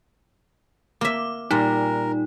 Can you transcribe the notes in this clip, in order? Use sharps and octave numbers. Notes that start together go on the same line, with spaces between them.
A#3 E5 D6
A#2 G3 D#4 A#4